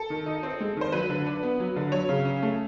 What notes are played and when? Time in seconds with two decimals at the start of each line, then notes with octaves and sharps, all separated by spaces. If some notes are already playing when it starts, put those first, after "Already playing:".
Already playing: A4
0.10 D#3
0.26 D#4
0.43 C4
0.60 G#3
0.77 D#3 C5
0.92 F#3 B4
1.10 D3
1.26 D4
1.43 B3
1.60 F#3
1.76 D3
1.92 F#3 C#5
2.09 C#3
2.25 C#4
2.43 A3